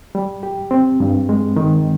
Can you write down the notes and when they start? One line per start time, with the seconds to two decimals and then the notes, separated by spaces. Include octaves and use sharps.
0.15 G3
0.43 G4
0.71 C4
1.00 G2
1.29 G#3
1.56 D#3